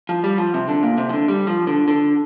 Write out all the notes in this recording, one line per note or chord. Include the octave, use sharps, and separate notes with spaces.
F3
G3
F3
C3
D3
A#2
C3
F3
D3
G3
F3
D3
D3